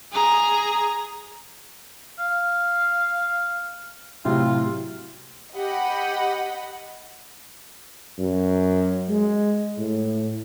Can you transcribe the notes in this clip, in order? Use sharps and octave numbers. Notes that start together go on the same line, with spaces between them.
G#4 A#5
F5
A2 C3 F#3 F4
G4 D#5 F#5 B5
F#2
G#3
A2